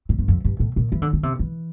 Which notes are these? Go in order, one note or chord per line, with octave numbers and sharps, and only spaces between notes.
A2
G2
F2
G2
A2
A#2
E3
D3
D3
C3
E3